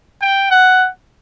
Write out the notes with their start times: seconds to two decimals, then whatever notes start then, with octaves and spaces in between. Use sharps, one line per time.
0.21 G5
0.50 F#5